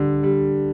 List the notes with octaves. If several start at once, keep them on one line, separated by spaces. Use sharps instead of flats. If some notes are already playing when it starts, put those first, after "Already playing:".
Already playing: D3 G3
G3